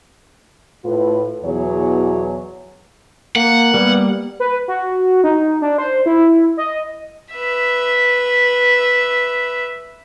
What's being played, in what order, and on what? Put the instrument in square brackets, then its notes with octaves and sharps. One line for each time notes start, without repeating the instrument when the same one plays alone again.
[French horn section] A2 F4 B4
E2 B2 E3 F#3 G#4 C#5
[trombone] A#3 [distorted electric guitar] F#5
[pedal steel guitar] G3 A#3 [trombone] B3
[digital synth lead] B4
F#4
D#4
D4
C5
E4
D#5
[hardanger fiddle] B4 E5